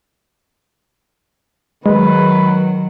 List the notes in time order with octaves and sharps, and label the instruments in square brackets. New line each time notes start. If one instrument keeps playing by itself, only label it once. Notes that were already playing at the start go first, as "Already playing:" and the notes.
[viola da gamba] D#3 F#3 [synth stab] G#3 [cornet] B4